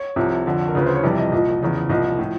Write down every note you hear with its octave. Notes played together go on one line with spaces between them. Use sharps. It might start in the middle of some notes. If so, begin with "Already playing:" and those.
Already playing: C#5
C2 C3 F3
F2 D3 F3
A#4
D2 C#3 F3 B4
C5
C#5
F2 C3 E3 G3 D5
D#5
C2 A#2 F3 D#5
E2 C#3 F3
C2 A#2 F3 D#5
A2 F3